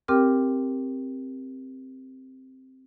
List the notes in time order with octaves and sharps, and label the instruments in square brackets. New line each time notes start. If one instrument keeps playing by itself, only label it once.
[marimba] C4 G4 A#4 G5 D6 F6